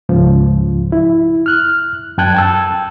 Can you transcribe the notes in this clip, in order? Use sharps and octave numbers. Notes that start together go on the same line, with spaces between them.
C#2 G#2 F3
E4
F6 F#6
F#2 G5 A5 F#6 G#6
G5 A5 E6